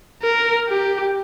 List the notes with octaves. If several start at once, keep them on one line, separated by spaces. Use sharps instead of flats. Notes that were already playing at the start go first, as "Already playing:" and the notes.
A#4
G4